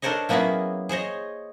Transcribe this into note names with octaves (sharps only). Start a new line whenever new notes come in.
D4 A4 A#4 C5 C#5 D#5
F#3 A#3 B3 C#4 E4 G#4
G#4 C5 C#5 D#5